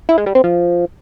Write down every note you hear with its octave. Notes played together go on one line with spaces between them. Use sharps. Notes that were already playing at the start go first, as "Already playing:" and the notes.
E4
G#3
G3
C4
F3